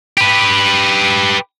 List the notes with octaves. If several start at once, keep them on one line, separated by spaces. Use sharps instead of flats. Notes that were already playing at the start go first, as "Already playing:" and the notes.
G4 B4